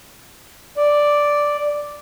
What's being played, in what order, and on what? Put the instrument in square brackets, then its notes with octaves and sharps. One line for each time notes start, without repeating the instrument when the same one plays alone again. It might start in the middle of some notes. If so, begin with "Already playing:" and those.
[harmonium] D5